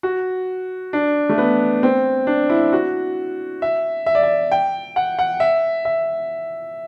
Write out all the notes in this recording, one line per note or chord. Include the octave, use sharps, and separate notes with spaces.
F#4
D4
A3
B3
C4
D4
E4
F#4
E5
E5
D5
E5
G5
F#5
F#5
E5
E5